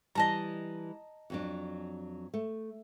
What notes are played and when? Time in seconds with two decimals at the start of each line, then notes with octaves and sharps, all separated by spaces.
0.15 E3 G3 D#5 A5 A#5
1.30 F2 F#3 D4
2.34 A3